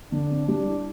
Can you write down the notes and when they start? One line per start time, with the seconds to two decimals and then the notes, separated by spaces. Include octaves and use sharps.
0.12 D3 D4
0.30 C4
0.48 G3 D4
0.67 E4